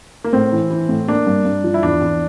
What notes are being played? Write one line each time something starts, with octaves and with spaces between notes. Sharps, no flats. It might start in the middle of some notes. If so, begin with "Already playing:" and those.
A#3
A2 C4
E3
E3
A2
A#3 D4
G2
G2
F3
E4
E2 D4
E2